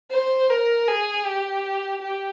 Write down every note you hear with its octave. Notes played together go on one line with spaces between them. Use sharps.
C5
A#4
G#4
G4
G4